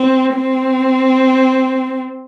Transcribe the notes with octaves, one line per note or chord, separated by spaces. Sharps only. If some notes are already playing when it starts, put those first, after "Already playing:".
Already playing: C4
C4